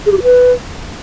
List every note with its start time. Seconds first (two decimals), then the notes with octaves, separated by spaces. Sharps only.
0.06 G#4
0.12 G4
0.17 F#4
0.23 B4